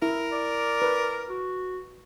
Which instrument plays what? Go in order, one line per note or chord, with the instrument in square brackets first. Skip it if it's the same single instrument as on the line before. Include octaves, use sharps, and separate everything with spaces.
[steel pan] E4 [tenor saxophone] A#4
[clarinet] D5
[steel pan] B4
[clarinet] F#4